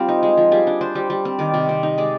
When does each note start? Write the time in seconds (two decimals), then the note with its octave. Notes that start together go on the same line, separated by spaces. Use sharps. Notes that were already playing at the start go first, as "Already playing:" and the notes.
Already playing: G3 C4 F4
0.09 D#4
0.23 G#3
0.37 F3
0.52 G3 G#4
0.67 D4
0.81 D4 C5
0.95 G3
1.10 G3
1.25 C4
1.39 D#3 D5
1.54 C3
1.69 C4
1.83 D#4
1.98 G#3 D5